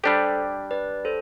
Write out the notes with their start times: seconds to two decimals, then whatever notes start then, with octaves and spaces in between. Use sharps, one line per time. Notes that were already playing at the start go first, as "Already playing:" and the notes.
0.04 G3 D4 G4 A4 C5
0.71 B4 D5
1.05 A4 C5